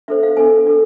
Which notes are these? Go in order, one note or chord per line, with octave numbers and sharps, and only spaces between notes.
D4 A4 C5 E5
F5
D4 A4 C5 G#5
D4 A4